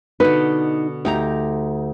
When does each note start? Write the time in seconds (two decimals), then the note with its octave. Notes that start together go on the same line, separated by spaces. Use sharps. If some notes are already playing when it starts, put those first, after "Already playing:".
0.20 B2 D3 D#4 B4
1.05 D2 D#4 G4 A#5